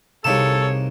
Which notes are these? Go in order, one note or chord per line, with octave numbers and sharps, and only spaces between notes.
C2 C3 A#3 D#4 G#4 A4 C#5 A5